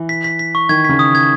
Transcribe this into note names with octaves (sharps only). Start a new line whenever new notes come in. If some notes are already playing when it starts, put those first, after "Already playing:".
Already playing: E3
B6
B6
B6
C#6
D#3 G#6
C#3 B6
D#6
G#6